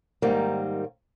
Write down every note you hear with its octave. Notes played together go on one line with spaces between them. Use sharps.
G#2 D#3 G3 A#3 C4